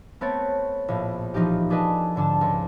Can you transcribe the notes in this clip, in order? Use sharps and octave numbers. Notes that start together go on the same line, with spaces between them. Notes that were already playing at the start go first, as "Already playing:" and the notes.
A3 B3 C4 C#5 A6 D7
A#1 A2
E3 F3 D#4 F4 G4
D4 G#4 A4 B4 D5 D#5
G#2 D3 D4 A5
C#2 C6